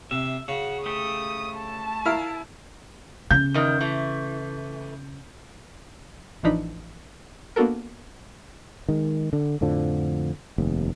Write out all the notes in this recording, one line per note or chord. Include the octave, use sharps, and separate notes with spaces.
C3 E5
C#3 F#4
A3 G4 A4 D#6
A5
E4 A#4 F5 F6
C#3 G6
E2 D#3
E3 A3
A1 E3 F3 D4 D#4 B5
A#3 B3 D4 F#4 A4 A#4
D#3 G#3
D3
F2 A2 D3 F3
F1 D#2